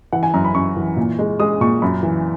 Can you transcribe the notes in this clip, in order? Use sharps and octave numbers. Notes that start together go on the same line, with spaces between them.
E3 F#5
G#5
F#2 A#5
B5
F#2 C#6
E3
A#2
G#3
G#3 D#6
A#2 C#6
F#2 B5
E3